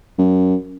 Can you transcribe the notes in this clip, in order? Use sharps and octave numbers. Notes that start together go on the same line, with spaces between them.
F#2